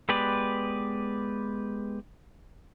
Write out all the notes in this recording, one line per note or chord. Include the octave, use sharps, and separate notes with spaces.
G#3 B3 G4 B4 D5